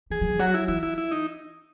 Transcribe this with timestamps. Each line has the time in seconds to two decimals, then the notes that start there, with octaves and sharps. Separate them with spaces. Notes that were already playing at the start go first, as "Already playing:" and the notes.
0.10 E3 G#4
0.21 F#3
0.30 E3
0.39 F#3 F#4
0.54 E4
0.68 E3 E4
0.83 E4
0.98 E4
1.11 D#4